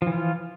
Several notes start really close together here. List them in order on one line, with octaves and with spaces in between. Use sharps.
F3 E3 F4